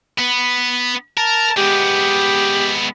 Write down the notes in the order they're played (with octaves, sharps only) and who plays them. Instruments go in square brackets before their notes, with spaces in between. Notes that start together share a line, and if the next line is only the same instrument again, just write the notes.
[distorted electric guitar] B3 B4
[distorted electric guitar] A#4 [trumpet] A5
[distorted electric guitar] G#3 B3 [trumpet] G4